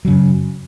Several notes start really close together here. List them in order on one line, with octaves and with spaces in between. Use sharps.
F#3 C#3 F#2